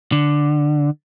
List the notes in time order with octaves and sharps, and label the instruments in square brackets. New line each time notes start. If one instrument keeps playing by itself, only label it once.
[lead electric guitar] D3